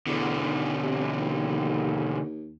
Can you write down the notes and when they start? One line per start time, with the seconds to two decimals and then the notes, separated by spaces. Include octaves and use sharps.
0.07 E2 B2 D3
0.44 D#3
0.83 C3
1.17 D#2